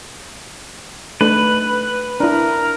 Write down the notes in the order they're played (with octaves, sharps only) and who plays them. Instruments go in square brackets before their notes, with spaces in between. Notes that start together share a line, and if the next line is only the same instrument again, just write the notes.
[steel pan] A3 D4 D#4 [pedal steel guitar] B4
[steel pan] D4 E4 [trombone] A#4